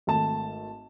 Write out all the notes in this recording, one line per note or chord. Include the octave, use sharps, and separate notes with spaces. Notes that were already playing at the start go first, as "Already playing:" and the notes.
G#1 A3 A5 E7